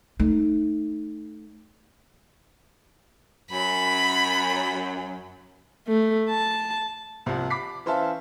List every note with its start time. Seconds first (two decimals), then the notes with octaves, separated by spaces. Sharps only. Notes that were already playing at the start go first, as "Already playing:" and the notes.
0.20 A3 D#4
3.51 F#2 B5
5.87 A3
6.29 A5
7.26 C2 C3 F3
7.50 B5 D6 B6 C7
7.86 E3 C#4 C5 E5 F5 A5